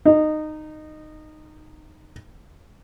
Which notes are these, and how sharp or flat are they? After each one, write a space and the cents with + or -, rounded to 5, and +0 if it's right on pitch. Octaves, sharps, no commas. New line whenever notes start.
D#4 -15